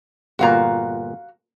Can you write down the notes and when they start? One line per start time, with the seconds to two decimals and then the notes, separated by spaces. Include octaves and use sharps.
0.39 G1 A#2 F#4 F5 A#5